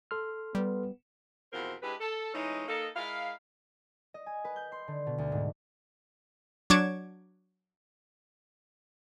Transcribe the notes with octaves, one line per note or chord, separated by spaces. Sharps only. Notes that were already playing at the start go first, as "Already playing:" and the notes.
A4 C6 F6
G3 B3
E2 B2 F3 C4 A#4 C5
G#3 D4 E4 G4 B4
A4
E3 G#3 A3 C#4 D#4
A#3 D#4 A4
G#3 E4 A#4 F5
D#5
G#5
B4
G6
C6
D3
B2
D2
G#2
F#3 D4 C#6 D6 G#6 E7